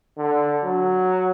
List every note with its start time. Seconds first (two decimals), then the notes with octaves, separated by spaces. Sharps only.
0.18 D3
0.64 F#3